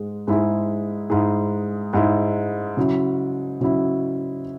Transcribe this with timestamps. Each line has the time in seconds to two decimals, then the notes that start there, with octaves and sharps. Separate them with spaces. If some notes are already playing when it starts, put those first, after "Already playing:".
Already playing: G#2 G#3 G#4
0.27 G#2 G#3 E4 G#4
1.10 G#2 G#3 E4 G#4
1.93 G#2 G#3 E4 G#4
2.77 C#3 F#3 E4
3.61 C#3 F#3 E4